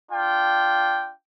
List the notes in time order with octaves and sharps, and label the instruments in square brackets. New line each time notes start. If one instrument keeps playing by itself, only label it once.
[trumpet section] D4 F4 G5